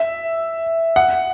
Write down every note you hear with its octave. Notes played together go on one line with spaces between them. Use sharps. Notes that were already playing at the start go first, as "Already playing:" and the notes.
Already playing: E5
F#5